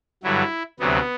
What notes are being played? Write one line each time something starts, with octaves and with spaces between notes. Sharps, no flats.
G2 D3 F#3 E4
D2 C3 F#3 B3